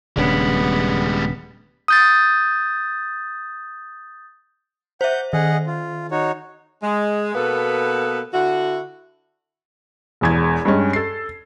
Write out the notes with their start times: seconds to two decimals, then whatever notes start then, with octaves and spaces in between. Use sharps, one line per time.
0.17 D#1 C#3 G3 G#3 B3 C#4 D4
1.88 D#6 G6 A6
5.01 C5 E5 F#5 G6
5.33 D#3 G#4 D#5 F#5
5.67 F4
6.11 D#4 F#4 C#5
6.83 G#3
7.34 B2 A#3 B3 A4 B4
8.34 D3 E4 F#4
10.21 E1 E2 G#6
10.65 G2 G#3 C#4
10.93 A4 C7